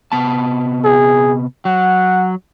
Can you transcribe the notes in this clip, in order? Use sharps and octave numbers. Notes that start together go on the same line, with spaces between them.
C3 B3 A5
G#4
F#3 F#5